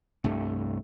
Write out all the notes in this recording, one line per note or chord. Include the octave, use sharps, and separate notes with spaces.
C2 G2 A3